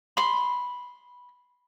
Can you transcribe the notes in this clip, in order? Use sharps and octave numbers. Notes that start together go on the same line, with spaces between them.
B5 C6